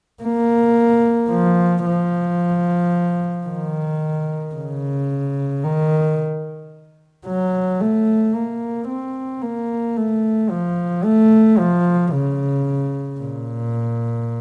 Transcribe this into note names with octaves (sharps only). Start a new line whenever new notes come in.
A#3
F3
F3
D#3
C#3
D#3
F#3
A3
A#3
C4
A#3
A3
F3
A3
F3
C#3
A#2